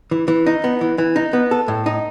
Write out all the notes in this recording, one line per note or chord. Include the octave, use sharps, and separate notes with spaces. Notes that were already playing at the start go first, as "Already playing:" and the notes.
E3
E3
D#4
B3
E3
E3
D#4
B3
A4
A2
D#4